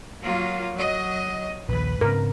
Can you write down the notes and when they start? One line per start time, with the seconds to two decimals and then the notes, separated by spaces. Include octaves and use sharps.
0.24 F#3 A#3 F4
0.77 F#3 D#5
1.68 A#1 D#2 B4
2.01 G#2 C#3 C4 A#4